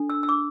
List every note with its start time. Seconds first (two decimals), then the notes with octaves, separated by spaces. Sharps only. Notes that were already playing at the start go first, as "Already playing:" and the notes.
Already playing: D4 A4
0.10 E6
0.23 E6
0.29 D6